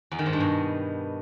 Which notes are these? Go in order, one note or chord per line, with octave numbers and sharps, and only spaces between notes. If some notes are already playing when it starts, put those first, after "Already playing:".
E2
D#3
G#2
G2
B2